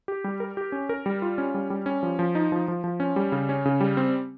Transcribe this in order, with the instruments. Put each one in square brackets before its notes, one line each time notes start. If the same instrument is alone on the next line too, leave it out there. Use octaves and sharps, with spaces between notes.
[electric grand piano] G4
G3
A#4
G4
C#4
A#4
G3
F4
C#4
G3
G3
C#4
F3
F3
D#4
F3
F3
F3
C#4
G3
C#3
C#4
C#3
G3
C4